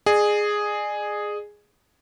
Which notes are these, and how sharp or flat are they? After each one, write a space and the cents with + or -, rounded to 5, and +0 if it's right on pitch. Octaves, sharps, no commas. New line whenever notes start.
G#4 +0 D5 +45